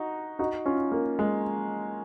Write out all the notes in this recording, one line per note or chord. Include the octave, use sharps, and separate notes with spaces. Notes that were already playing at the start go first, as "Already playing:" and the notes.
Already playing: D#4 F#4
D#4 F#4
C#4 F4
A#3
G#3